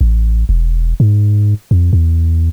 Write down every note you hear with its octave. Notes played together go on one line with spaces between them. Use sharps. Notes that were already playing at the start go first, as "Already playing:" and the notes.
A1
E1
G#2
F2
E2